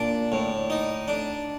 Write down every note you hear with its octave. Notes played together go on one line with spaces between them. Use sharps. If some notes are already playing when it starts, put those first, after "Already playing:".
Already playing: A#2 D4
A2
D#4
D4